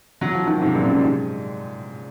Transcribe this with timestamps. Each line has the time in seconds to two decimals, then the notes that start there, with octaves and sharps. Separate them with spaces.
0.21 F#3
0.34 F3
0.47 D#3 F#3
0.61 G#2 C3
0.75 F#2 A#2
0.83 C3
0.87 F#2 A#2
1.01 G#2